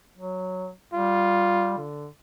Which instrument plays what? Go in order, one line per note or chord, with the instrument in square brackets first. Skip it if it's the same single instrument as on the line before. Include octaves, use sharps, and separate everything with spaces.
[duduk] F#3
[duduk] G3 [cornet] F4
[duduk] D3